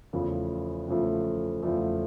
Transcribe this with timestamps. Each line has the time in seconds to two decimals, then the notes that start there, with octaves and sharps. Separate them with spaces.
0.13 E2 C#3 F3 A3
0.88 E2 C#3 F3 A3
1.63 E2 C#3 F3 A3